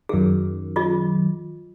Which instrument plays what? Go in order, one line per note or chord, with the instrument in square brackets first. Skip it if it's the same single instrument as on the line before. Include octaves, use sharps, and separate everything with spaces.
[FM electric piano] F#2 D#3 [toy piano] G#4
[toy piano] F4 G#4 D#5